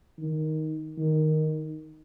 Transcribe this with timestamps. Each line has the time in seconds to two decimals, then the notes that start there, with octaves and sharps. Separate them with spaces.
0.19 D#3
0.98 D#3